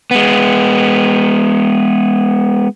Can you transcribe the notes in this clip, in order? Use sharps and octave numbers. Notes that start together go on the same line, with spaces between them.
G#3 B3